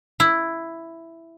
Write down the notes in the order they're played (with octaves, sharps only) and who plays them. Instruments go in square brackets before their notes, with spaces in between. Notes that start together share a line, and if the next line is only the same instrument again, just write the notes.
[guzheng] E4